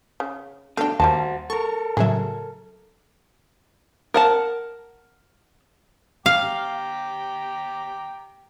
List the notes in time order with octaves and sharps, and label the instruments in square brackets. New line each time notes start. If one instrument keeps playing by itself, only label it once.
[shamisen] C#3
[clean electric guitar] B2 D3 [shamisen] A3 D4 [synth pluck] F5 G5
[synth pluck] D#2 [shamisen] G3 A#3 A5 [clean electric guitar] F#4 C5
[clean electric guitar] A4 A#4 [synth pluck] C#6
[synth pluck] A2 C#3 F#3 [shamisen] G#4 E5
[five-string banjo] A#4 F#5 A5
[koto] F5 [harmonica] G5 A#5 D6